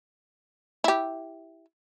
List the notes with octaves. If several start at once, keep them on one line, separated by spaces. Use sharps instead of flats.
E4 G4